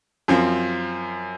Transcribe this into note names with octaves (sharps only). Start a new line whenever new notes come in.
F#2 F3 C4